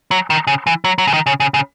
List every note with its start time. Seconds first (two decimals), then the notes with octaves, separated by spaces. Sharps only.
0.11 F#3
0.30 D#3
0.47 C#3
0.67 E3
0.84 F#3
0.98 F#3
1.07 C#3
1.13 D#3
1.26 C#3
1.40 C#3
1.54 C#3